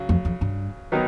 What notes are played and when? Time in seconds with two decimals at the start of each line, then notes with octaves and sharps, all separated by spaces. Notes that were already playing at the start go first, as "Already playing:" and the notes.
Already playing: C#3 F#3
0.09 F2
0.25 F2
0.41 G2
0.92 D#3 F#3 B3 D#4